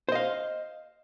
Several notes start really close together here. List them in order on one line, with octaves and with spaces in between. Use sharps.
C5 D#5 F5